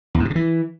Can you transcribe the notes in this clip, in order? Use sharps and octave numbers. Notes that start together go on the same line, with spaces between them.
E2
G#2
B2
C#3
E3